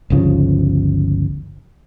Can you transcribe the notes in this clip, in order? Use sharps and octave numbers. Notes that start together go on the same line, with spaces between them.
G1 C#2 C#3 F3